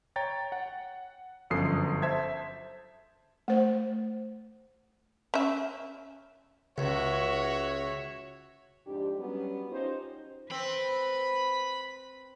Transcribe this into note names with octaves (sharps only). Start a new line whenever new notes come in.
C#5 G5 A#5 A6
F#5
G1 F#2 F3 A4 D#6 C7
C5 E5 A5 G#6
A3 C5
C#4 E5
C#2 C#3 F#4 C#5 E5
F2 G#2 D4 G4
F#3 G3 B3 C#4 F#4 G4
C#4 D#4 F4 G4 C5
C4 B4 B5